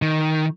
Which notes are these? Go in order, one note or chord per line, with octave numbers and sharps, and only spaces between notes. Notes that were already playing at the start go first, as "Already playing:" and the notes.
D#3